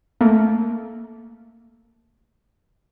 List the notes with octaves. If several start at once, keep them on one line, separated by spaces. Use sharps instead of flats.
A3 A#3